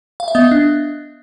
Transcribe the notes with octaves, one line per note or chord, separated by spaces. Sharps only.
F5
E5
B3 D#5
D4